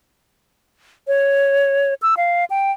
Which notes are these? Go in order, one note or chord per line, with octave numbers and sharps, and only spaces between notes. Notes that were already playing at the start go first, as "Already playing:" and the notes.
C#5
E6
F5
G5